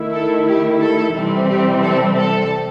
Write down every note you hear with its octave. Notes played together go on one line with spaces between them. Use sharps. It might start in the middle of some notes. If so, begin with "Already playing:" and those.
Already playing: D#3 A3 E4
A4
G4
A4
C3 E3 G3 C4
G4
A4
A4